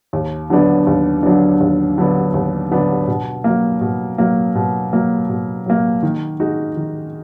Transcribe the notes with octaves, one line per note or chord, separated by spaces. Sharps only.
D#2
D3 F#3 B3 D4
D#2
D3 F#3 B3 D4
D#2
D3 F#3 B3 D4
D#2
D3 F#3 B3 D4
B2
F#3 A#3
B2
F#3 A#3
B2
F#3 A#3
B2
F#3 A#3
D#3
G#3 D#4 F#4
D#3